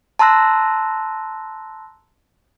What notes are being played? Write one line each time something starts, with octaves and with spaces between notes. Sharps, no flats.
A5 A#5 C6 E6 F#6 A#6